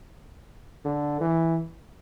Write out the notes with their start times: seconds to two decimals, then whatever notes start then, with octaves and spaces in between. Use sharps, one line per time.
0.85 D3
1.21 E3